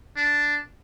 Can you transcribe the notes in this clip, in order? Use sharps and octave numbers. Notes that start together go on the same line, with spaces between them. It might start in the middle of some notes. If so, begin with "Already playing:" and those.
D4